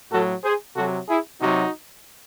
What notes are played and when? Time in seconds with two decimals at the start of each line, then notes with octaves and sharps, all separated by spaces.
0.11 A2 F#3 F#4 A4
0.44 G#4 C5
0.76 C3 F#3 F#4 A4
1.08 E4 G#4
1.41 C3 F#3 D#4 F#4